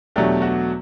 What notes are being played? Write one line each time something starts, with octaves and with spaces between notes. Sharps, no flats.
E2 B2 F#3 A3 D4 G4
F#4